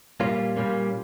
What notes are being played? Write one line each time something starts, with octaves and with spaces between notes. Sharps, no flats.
A#2 G3 A#3 C#4 F4
A#2 G3 A#3 C#4